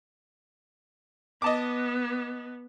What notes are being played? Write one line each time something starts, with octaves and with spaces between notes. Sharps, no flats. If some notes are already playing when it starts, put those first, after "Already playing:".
B3 D#5 A5 D6